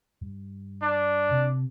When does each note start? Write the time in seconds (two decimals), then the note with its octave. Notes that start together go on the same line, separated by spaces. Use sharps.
0.21 G2
0.82 D4
1.31 C3